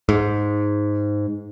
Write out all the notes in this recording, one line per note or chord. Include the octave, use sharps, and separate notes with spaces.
G#2